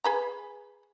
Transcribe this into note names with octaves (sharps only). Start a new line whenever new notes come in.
G#4 B4 A#5